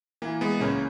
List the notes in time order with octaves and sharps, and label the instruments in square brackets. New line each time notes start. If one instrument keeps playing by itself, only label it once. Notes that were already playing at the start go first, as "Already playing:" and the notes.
[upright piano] E3 [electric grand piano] A#3
[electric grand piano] G#3 B3
[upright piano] C#2 [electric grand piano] A#3 C#4